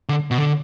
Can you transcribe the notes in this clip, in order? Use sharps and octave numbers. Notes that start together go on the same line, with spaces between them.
D3
B2
D3